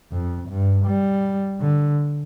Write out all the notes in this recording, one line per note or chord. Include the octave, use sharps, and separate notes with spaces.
F2
G2
G3
D3